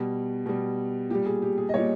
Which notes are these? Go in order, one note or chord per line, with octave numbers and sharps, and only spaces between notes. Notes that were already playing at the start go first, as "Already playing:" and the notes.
Already playing: B2 G3
B2 G3
A#2 G3 G4
G#4
G4
G#4
D#5
A#2 G3 C#5